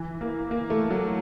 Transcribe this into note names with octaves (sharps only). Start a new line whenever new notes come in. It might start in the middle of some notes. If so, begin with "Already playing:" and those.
Already playing: E3
A#3
A#3
A3
F#3